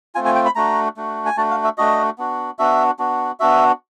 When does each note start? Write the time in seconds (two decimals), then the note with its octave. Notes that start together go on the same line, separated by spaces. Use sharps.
0.15 A3 C4 F4 G#5
0.25 G#5
0.35 G5
0.46 B5
0.56 A3 D4 F#4 A#5
0.97 A3 D4 F#4
1.26 G#5
1.37 A3 D4 F#4 A5
1.51 F5
1.64 E5
1.78 A3 D4 F#4 D#5
2.18 B3 D4 F#4
2.59 B3 D4 F#4 E5
2.99 B3 D4 F#4
3.40 B3 D4 F#4 E5